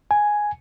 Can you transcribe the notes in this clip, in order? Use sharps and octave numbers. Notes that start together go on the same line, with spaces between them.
G#5